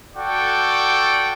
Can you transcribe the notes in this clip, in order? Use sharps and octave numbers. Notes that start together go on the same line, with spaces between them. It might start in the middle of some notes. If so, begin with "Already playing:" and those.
F#4 A4 D5 G5